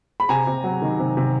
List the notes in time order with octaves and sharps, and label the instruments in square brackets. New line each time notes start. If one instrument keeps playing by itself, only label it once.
[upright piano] B5
C3 G#5 A#5
C3
F#3
D#3
C3
C3